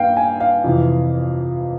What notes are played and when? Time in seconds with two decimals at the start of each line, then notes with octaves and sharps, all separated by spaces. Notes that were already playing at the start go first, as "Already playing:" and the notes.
Already playing: G2 A#3 F5 G5
0.17 G#5
0.40 F5
0.64 F2 C3 E3